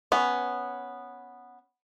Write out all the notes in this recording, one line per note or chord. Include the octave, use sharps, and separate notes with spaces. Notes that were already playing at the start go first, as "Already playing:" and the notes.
B3 C#4